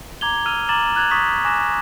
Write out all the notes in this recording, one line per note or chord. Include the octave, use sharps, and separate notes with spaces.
A#5 D6 G#6 F7 G7
E6 F6 D#7 F7 G7
A#5 D6 E6 A6 E7 F#7
F6 F#6 G#6 A6 F7 F#7
C#6 D#6 A6 B6
G#5 C#6 D6 F#6 A#6 E7